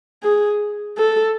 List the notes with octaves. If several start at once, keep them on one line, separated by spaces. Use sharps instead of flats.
G#4
A4